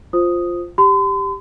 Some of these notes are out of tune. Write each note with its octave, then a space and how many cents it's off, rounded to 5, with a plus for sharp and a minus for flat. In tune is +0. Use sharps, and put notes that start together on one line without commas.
F4 +0 C5 +0 D#6 +0
G4 +0 C6 -45